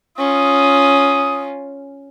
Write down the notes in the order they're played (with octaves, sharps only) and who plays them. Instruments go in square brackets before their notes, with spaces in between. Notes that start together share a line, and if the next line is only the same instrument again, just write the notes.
[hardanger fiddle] C#4 F4 [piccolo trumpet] D#6